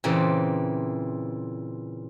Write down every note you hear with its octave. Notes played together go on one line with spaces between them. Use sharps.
A#2 C#3 E3 C4